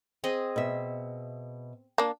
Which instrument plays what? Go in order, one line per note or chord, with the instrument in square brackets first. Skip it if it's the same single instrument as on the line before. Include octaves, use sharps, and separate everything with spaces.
[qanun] C4 G#4 D#5
[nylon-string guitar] B2 E5
[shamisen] A#3 D4